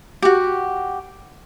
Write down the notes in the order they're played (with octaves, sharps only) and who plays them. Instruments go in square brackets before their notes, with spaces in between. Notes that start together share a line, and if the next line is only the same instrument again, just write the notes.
[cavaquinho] F#4 G4